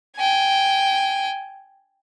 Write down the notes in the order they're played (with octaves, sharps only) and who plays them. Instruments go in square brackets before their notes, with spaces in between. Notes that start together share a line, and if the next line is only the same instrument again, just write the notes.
[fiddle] G5 G#5